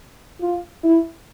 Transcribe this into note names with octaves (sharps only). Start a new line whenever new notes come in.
F4
E4